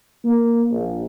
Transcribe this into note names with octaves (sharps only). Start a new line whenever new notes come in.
A#3
A#1